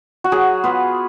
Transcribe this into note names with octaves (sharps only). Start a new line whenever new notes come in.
F#4
F#3 G#4
B3 F4 B4